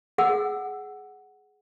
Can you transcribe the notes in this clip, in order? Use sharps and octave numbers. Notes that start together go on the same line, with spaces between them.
G#4 F#5 E6